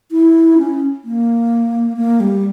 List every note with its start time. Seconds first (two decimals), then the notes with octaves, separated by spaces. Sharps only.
0.12 E4
0.58 C#4
1.04 A#3
1.97 A#3
2.20 G3